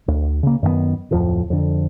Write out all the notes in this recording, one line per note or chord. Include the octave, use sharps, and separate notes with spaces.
D2
C#3 A#3
F#2 D#3 A3 B3
D1 F2 F3
F2 D3